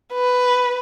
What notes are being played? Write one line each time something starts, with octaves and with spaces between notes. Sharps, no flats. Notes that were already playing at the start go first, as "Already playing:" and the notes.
B4